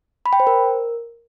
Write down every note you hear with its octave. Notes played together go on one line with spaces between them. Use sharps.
B5
G5
C5
A#4